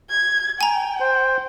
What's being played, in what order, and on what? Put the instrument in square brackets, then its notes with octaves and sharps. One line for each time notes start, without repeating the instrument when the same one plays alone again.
[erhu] G#6
[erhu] G5 [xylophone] G#5 A#5
[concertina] C5